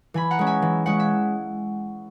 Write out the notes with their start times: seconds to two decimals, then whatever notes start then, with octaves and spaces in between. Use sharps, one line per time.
0.14 E3 G#5 B5
0.31 F#5 A#5
0.39 G#3 C#4
0.47 E5 G#5
0.62 E3
0.86 G#3 C#4 F#5
1.00 E5